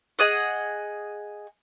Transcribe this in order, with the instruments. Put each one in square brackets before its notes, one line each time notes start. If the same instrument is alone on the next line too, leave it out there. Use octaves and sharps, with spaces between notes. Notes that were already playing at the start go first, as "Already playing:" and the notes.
[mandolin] G#4 D#5 F#5